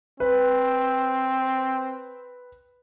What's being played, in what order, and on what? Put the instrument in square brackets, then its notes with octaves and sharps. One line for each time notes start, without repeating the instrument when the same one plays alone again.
[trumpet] C4 [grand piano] B4